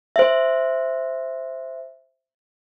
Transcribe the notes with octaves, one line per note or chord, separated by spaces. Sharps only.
C5 E5